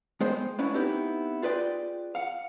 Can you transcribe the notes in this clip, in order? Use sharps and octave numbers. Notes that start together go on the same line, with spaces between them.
G#3 B3 C5 G5
A#3 B3 C#4 D4 E4
B3 C4 D#4 E4 G4 B4
F4 G#4 B4 D5 G5
F5 F#5